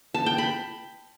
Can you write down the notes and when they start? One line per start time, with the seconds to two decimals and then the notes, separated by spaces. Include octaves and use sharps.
0.14 A5
0.26 G5
0.38 B5